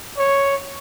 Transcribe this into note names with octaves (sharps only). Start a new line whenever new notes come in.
C#5